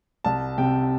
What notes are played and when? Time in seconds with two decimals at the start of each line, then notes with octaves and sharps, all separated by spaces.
0.24 C2 A5
0.58 C3 G5